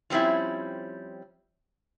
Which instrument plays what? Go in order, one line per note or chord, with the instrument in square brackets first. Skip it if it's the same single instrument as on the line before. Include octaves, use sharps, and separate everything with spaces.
[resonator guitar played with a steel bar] F3 G3 C4 C#4 E4